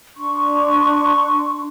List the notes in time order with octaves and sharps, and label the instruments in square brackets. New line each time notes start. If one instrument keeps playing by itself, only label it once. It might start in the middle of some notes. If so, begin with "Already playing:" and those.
[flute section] D4 C6 C#6